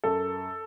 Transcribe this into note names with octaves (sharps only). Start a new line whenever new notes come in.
F#2 A4